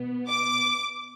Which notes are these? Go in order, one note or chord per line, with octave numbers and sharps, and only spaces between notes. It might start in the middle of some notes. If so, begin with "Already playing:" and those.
Already playing: B2 B3
D6